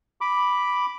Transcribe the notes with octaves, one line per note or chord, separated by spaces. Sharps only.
B5 D6